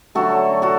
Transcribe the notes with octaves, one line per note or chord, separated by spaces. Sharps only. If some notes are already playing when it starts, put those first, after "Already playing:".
D3 F#3 A3 F#4 A4
F#4 A4